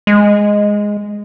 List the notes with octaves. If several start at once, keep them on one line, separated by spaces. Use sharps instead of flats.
G#3